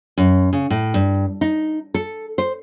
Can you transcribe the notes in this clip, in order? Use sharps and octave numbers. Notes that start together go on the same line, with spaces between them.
F#2
C#3
A2
G2
D#4
A4
C5